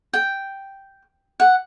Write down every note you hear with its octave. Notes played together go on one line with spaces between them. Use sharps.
G5
F#5